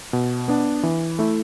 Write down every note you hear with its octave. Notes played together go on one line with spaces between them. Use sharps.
B2
B3 D4
E3
A3 E4